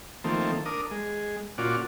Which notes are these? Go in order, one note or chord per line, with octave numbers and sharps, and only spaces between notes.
D#3 F3 A3 A#3 C4
D4 A#4 D#6
G#3
A#2 C#4 F4 F#4 D5